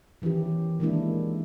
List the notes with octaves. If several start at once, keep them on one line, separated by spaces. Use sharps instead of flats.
D#3 E3 C#4 E4 G4
D#3 E3 G#3 A#3 D4 E4